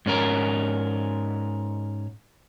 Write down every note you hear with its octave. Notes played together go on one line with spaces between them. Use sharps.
G#2 C#4 A#4